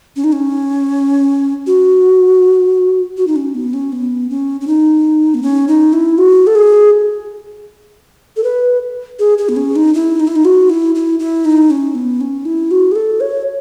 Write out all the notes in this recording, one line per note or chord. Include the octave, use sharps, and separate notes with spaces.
C#4
D#4
C#4
F#4
F#4
D#4
C#4
B3
C#4
B3
C#4
C#4
D#4
B3
C#4
D#4
E4
F#4
A4
G#4
A4
B4
G#4
G#4
B3
C#4
D#4
E4
D#4
E4
D#4
F#4
E4
E4
E4
D#4
C#4
B3
C#4
E4
F#4
G#4
A4
C#5